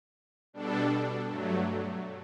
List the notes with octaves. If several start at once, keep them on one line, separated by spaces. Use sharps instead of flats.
B2 G3 D4 A4
G2 F#3 A3